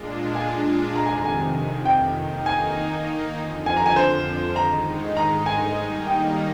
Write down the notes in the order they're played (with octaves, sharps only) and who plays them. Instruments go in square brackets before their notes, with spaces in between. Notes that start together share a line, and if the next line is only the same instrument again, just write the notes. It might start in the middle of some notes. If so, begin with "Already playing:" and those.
Already playing: [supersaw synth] A#2 G#3 D4 F4
[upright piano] G#5
[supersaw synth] F2 C3 D#3 [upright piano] A#5
[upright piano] G#5
A#5
G#5
G5
[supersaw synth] D#3 A#3 D#4
[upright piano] G#5
[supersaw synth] F2 D3 F3
[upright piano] G#5
A#5
G#5
C5
[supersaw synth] G#2 D#3 G#3 D#4 [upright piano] A#5
[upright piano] A#5
G#5
[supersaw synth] D#3 G3 A#3 D#4
[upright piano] G5